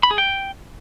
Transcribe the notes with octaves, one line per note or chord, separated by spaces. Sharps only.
B5
G#4
G5